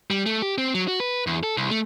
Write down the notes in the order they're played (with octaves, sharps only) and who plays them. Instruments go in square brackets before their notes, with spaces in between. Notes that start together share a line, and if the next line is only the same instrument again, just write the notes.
[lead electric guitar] G3
A3
G4
C4
F#3
F#4
B4
E2
A4
C2
A3